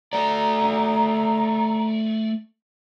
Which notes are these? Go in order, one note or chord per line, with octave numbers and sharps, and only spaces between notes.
A3 D5 A#5